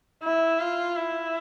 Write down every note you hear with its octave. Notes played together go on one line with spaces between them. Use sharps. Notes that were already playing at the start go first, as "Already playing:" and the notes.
E4
F4
E4